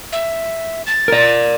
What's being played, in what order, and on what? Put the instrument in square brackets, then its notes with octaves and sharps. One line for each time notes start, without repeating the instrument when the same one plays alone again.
[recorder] E5
A6
[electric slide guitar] A#4 D5